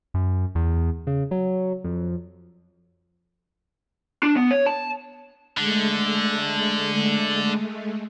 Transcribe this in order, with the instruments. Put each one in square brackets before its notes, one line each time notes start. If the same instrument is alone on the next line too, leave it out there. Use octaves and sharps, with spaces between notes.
[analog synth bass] F#2
E2
C#3
F#3
F2
[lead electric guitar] D4
B3
C#5
A5
[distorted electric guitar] D3 [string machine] G#3 A3